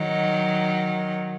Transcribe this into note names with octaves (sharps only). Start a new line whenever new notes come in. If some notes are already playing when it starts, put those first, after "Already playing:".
Already playing: D#3 F#3